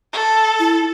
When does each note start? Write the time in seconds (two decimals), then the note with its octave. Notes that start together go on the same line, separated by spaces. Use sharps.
0.12 A4
0.60 E4